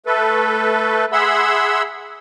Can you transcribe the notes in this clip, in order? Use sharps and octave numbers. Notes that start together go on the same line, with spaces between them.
A3 A4 B4
G#4 E5 F#5 B5 C6 E6